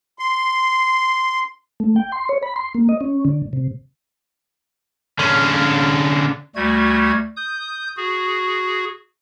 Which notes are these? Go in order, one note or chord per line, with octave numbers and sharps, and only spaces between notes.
C6
A3
G5
C6
C#5
B5
C6
A#3
D#5
C#4
D3
C3
D3 C#4
D2 G3 A3 F#4 G#6
D#6 G6
F#4 G#4